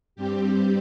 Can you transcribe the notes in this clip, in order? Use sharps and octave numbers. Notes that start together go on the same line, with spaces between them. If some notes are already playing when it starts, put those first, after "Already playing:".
G2 G3 C4 G4